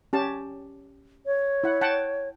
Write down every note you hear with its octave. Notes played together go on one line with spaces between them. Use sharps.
C#4 G4 A5
C#5
E4 F#5
F#5 G5 A5